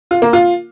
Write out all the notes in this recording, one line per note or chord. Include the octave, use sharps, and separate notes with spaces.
F4
A#3
F4